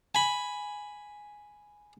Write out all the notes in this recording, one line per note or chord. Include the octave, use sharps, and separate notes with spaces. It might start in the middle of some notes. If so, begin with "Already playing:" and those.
G#5 B5